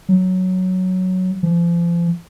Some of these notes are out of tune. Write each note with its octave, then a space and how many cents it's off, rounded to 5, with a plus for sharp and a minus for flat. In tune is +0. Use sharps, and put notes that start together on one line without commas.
F#3 +0
F3 -35